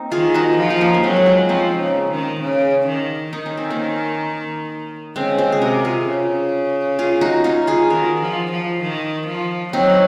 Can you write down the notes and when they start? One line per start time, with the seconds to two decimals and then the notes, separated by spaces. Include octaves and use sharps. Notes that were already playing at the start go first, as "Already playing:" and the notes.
Already playing: A#3 C4 D#4
0.12 D#3 F4 G#4
0.34 D#4 F#4
0.57 F3
0.70 D#4
0.80 A#3 C#4
0.94 A#3
1.03 F#3 G#3 C4
1.16 F#4
1.26 C#4 F4
1.49 F3 C4 D#4
1.79 C#3
2.11 D#3
2.41 C#3
2.87 D#3
3.33 D#3 D#4
3.46 C#4
3.57 C4
3.70 A#3 C#4
5.16 C#3 G#3 C4
5.38 G#3 C4
5.52 G#4
5.61 C3 F#4 A#4
5.85 F4 G#4
6.07 C#3
6.99 F4 G#4
7.21 D#4 F#4
7.44 C#4 F4
7.67 F4 G#4
7.90 D#3 F#4 A#4
8.22 F3
8.52 F3
8.82 D#3
9.28 F3
9.73 F#3 C4 D#4